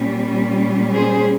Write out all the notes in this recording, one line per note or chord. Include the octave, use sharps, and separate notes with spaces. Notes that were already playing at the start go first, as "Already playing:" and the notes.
Already playing: A#2 G3 C#4
G#4 C5